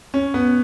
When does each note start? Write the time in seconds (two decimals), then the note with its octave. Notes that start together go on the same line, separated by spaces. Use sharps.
0.14 C#4
0.34 B3